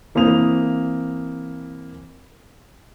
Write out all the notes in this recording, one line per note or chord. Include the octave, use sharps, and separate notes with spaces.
E3 A#3 C4 D#6 F7